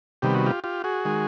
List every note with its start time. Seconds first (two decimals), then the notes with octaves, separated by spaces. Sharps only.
0.22 C3 D#3 G3 B3 G4
0.35 F#4
0.46 F4 G4
0.64 F4 G4
0.84 F#4 G#4
1.05 D#3 G#3